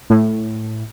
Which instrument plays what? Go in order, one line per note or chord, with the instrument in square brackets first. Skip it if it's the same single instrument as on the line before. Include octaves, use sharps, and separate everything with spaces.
[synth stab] A2